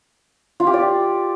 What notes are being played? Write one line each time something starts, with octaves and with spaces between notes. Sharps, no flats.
F4
G4
D5